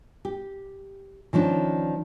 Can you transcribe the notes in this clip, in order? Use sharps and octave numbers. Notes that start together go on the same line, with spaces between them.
G4
D#3 F3 C#4 D4